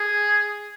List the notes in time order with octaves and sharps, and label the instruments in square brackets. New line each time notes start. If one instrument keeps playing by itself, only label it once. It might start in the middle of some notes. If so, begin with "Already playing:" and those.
Already playing: [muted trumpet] G#4